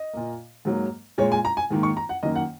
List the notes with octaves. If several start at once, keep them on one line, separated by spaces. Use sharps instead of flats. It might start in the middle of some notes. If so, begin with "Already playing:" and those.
Already playing: D#5
A#2 A#3
G#2 F#3 A#3
A#2 G#3 C#5
G#5
A#5
G#5
G#2 D#3 A#3
C#6
A#5
F#5
F#2 D#3 A#3 D#5
F#5